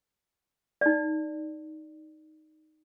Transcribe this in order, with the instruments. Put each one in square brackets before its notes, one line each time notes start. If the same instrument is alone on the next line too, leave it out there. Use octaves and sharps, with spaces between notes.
[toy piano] D#4 D5